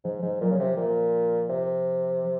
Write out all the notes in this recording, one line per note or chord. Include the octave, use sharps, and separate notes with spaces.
G#2 F3
G#2 F3
A#2 F#3
C#3
C3 F3
A#2 F3
C3